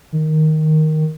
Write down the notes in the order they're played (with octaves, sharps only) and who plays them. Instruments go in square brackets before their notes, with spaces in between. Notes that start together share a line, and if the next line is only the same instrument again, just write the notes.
[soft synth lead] D#3